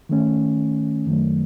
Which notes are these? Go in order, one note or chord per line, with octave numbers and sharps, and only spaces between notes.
D#3 A3 C#4
F#2 D#3 F#3 A3